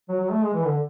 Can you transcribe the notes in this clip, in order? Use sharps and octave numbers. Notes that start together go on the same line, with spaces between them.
F#3
F#3
A3
G#3
E3
D3